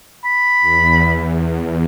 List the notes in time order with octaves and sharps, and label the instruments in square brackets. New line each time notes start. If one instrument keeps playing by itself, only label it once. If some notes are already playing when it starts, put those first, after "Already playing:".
[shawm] B5
[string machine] E2